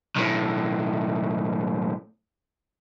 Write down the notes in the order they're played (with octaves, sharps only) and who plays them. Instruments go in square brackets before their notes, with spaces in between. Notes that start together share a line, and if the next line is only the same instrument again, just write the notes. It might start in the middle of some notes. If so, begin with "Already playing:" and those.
[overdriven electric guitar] B1 A2